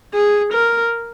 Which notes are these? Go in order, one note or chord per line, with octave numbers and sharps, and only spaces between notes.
G#4
A#4